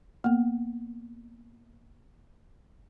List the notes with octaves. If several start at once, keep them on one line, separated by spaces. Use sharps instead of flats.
A#3 B3